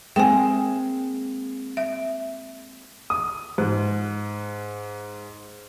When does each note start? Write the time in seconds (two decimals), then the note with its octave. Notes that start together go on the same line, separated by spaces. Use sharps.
0.16 G#3 A#3 C4 G5 G#5
1.77 E5
3.10 D#6
3.58 G#2